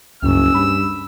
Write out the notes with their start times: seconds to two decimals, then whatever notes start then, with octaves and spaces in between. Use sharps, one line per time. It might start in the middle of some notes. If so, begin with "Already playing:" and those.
0.23 F#1 C#2 G2 C#4 E6
0.55 G2 B5